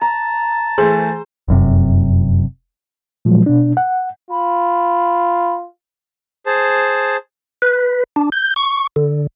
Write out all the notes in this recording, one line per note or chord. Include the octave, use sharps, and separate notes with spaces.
A5 A#5
E3 A3 G#4 C5
F1 F#2 C3
A#2 F3 F#3 G#3
B2 D4
F#5
F4 B5
G#4 C5 A5
B4
D4
G6
C#6
D3